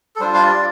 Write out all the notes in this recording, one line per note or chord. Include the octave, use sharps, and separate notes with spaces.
A4
G3 D4 F4 C5
F5
D5